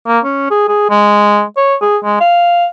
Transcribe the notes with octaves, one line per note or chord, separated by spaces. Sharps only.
A#3
C#4
G#4
G#4
G#3
C#5
G#4
G#3
F5